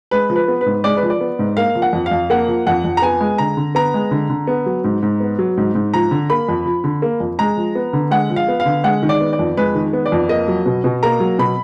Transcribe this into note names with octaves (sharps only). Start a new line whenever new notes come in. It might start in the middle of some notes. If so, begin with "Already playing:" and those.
G#3 B4
F3
B4
B3
B4
G#2
G#3 D5
B4
F3
D5
B3
G#2
A#3 F5
F3
F#5
F2
F5
F2
A#3 F#5
F3
F2 F#5
F2
A#5
B3 G#5
G#3
D3 A#5
D3
B3 A#5
G#3
D3
D3
B3
F#3
G#2
G#2
B3
F#3
G#2
G#2
F3 A#5
D3
A#3 B5
F2
F3
D3
A#3
F2
G#3 A#5
F3
B3
D3
G#3 F#5
F3
F5
B3
F5
D3
G#3 F#5
D#3
D5
B3
D5
F2
G#3 B4
D#3
B3
D5
F2
A#3 D#5
F#3
B2
B2
A#3 A#5
F#3
B2 B5